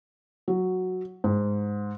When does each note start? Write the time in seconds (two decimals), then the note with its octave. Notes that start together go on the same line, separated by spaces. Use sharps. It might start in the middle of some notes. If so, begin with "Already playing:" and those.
0.48 F#3
1.24 G#2